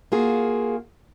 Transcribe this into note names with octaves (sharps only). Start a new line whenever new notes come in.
A#3 F4 F#4 G#4